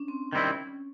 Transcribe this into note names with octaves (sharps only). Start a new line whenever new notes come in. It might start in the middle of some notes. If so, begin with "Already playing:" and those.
Already playing: C#4 D4
C4
D#3 G3 C4 C#4 E4